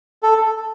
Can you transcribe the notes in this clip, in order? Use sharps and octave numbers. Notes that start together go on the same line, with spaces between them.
A4